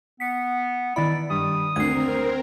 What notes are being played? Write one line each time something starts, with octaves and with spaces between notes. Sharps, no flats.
B3 B6 C#7
D#3 E3 E4 D5 B5
G2 D#6
D2 D3 C4 A#4 G#6 C7